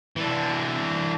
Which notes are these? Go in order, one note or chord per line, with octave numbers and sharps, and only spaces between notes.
E3 D4